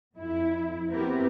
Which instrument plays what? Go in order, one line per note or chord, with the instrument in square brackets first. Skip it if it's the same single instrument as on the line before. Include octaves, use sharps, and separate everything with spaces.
[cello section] F2 E4
B3 C4 E4 G4 A#4 B4